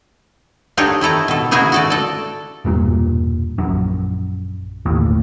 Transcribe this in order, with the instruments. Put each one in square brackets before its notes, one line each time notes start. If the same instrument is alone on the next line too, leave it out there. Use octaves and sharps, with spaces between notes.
[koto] D4 D#4 G4 A4 C#5
D#3 E4 A4 A#5
B2 A4
C#3 D#4 E4 F#4 G#4
F#4 A4 D5
A4 D5
[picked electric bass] E1 G2 A#2
A#1 F#2
G1 D#2 A2